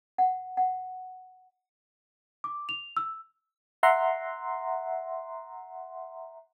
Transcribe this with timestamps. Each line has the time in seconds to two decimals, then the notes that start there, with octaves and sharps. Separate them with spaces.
0.18 F#5
0.57 F#5
2.44 D6
2.69 F7
2.97 E6
3.83 E5 F#5 A#5 C6